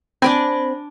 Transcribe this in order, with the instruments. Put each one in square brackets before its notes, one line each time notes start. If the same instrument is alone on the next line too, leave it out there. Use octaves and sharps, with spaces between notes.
[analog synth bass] C4 [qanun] D4 D5 G#5 [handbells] B5 A#6